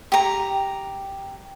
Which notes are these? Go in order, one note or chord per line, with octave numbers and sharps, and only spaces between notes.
G4 A#5